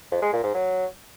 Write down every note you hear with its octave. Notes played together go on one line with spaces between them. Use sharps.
F2
G#3
A#2
G#2
F#3